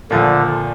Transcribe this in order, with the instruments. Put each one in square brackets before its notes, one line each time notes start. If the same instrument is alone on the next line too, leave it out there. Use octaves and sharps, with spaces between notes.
[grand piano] A#2 F3 A3 [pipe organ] D3